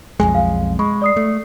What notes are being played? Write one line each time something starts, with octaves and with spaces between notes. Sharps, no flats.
B1 F2 G#3 G#5
F5
G#3 B5 C#6
D5 D#6 C7
A3